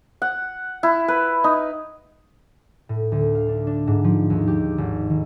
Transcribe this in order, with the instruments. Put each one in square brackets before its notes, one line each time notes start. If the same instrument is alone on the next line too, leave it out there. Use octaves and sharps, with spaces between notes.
[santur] F#5
E4
B4
D#4
[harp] A2
D2
F5
D4
D4
G#2
F3
D#2
G4
G#1
D#3